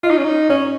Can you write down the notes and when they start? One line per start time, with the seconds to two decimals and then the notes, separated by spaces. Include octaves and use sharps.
0.03 F4 D#5
0.10 D#4
0.18 C#4
0.24 D#4
0.49 C#4 C#5